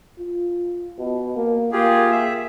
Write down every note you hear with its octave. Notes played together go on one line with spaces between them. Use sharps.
F4
B2
A#3
A#3 F4 G4 G#4
E5